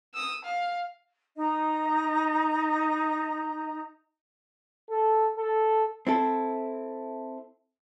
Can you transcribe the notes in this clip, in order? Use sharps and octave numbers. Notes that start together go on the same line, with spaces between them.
D#6 E6
F5
D#4 D#5 A#5
A4
A4
C4 E4 A4